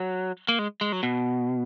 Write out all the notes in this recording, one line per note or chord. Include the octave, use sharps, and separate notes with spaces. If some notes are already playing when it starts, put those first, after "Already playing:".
Already playing: F#3
A#3
G#3
G#3
F#3
B2